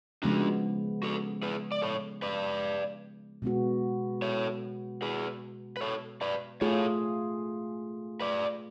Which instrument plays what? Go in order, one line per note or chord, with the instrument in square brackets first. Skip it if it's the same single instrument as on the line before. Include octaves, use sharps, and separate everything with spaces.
[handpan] C#3 F3 G#3 B3 [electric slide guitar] D4 F#4
[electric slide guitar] F#4 A4
G#4 B4
D5
A4 C#5
B4 D5
[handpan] B2 G#3 B3 F#4
[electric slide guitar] A4 C#5
G#4 B4
B4
A4 C#5
B4 D5
[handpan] A3 F4 G#4 [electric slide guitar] A4 C#5
[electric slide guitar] B4 D5